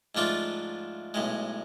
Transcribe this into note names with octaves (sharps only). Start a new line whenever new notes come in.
G#2 F3 A3 D4 F4
B1 A2 G#3